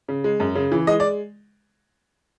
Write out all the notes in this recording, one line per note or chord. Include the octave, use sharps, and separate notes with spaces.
C#3
G#3
F#2
C#3
E3
G#3 D#5
D5